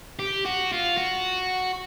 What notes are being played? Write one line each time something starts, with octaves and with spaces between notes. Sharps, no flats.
G4
F#4
F4
F#4